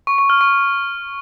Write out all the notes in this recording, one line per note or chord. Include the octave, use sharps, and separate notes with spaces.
C#6
C#6
F6
C#6